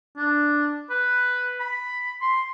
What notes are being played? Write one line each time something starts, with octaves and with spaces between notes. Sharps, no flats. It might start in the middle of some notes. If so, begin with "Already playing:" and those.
D4
B4
B5
C6